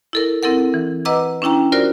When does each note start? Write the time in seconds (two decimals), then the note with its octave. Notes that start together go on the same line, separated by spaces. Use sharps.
0.13 E4 A4 A#4
0.43 C4 E4 A4 A#4 F#5
0.74 E3
1.05 B4 D#5 F#5 A#5 D6 E6
1.42 C#4 D4 E4 G5 A#5
1.72 F4 F#4 A#4 C5 D5